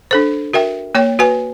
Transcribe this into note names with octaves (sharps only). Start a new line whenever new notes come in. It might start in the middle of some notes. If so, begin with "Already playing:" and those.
D4 A4 C5
F#4 A#4 E5 G5
A#3 C#5 G5
F#4 B4 G#5